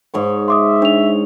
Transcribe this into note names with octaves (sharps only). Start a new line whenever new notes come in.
G#2 C#5 C#6
E5 C6 D6 D#6
D4 C#5 F7